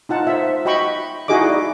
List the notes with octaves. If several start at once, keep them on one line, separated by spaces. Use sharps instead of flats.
D#4 F4 F#5 A5
C5 E5
F#4 D#5 G5 B5 C#6
D#4 E4 F#4 G#4 D#5 D6
D5